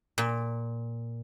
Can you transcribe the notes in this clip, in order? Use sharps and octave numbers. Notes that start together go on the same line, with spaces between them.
A#2